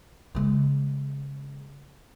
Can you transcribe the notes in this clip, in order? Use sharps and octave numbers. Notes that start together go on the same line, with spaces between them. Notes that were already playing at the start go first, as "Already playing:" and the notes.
C#3 G#3